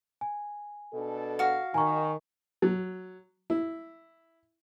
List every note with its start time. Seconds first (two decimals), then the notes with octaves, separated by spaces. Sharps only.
0.21 G#5
0.93 B2 D4 A4
1.39 F#4 F5
1.74 D#3 G#5 A#5 C#6
2.62 F#3
3.50 E4